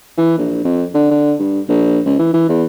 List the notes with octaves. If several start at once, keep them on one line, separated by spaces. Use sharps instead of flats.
E3
A#1
F2
D3
D3
G2
A#1
C#2
E3
E3
E2